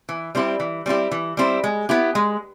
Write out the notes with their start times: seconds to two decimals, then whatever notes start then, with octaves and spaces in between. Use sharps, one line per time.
0.09 E3
0.35 G3 C4 E4 G4
0.60 E3
0.86 G3 C4 E4 G4
1.11 E3
1.37 G3 C4 E4 G4
1.64 G#3
1.89 B3 E4 G4
2.15 G#3